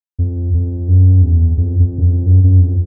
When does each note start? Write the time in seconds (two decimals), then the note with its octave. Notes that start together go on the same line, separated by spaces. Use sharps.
0.19 F2
0.54 F2
0.88 F#2
1.22 E2
1.58 F2
1.80 F2
1.98 F#2
2.04 F2
2.26 F#2
2.44 F#2
2.60 F2